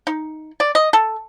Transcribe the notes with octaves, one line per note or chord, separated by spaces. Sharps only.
D#4
D5
D#5
A4